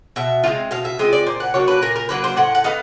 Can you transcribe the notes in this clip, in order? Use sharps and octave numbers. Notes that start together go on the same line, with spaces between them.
B2 E5
G#3 C4 F4 F5
B2 F5
E5
G#3 C4 F4 D#5
D5
A#2 C5
F#5
F#3 A#3 D4 C#5
B4
A#2 A#4
A#4
F#3 A#3 D4 B4
C5
A2 F#5
F#5
B3 D#4 F5